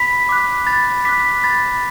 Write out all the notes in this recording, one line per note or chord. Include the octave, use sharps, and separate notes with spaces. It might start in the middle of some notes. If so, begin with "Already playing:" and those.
Already playing: B5 B6
D6 F#6
B5 A6
D6 F#6 B6
B5 A6